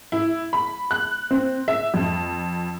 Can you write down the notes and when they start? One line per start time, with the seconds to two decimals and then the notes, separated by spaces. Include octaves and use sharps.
0.12 E4
0.53 B5
0.91 F#6
1.31 C4
1.68 E5
1.94 F2